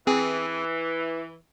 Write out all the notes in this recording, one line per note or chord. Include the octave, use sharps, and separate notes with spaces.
E3 C4 G#4 G#5